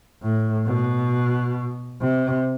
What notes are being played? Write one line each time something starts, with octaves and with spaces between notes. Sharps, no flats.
A2
B2
C3